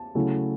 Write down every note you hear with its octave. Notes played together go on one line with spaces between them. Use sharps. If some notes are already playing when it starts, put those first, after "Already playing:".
Already playing: A5
C#3 F#3 A3 C#4 E4